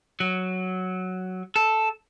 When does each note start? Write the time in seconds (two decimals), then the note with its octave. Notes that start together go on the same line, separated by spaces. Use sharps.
0.20 F#3
1.56 A4